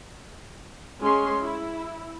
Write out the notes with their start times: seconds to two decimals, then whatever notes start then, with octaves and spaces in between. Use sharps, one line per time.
1.01 G#3 C#4 C6
1.42 E4